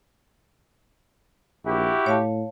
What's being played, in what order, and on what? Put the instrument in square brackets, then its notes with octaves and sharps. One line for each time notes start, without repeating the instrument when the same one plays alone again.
[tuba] A#1 [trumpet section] E4 F#4 G4
[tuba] A2 [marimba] C#5 F5 A5